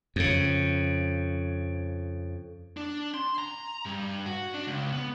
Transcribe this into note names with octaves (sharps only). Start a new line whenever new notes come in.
F2 C#3
D4
C6
A#5
G2
F#4
D4
C#2
B3